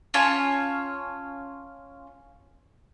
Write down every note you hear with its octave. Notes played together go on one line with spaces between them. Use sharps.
C#4 F4 C#5 A5